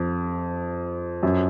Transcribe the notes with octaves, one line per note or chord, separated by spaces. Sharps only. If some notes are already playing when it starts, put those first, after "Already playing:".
Already playing: F2
F#2